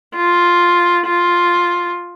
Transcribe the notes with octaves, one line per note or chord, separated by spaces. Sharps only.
F4
F4